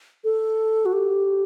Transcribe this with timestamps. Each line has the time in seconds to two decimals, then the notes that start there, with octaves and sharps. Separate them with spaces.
0.24 A4
0.86 F#4
0.93 G4